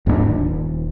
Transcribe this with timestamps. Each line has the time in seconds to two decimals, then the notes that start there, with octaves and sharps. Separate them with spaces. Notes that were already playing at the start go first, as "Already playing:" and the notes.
0.06 D1 G#2 A#3 D4
0.27 D#1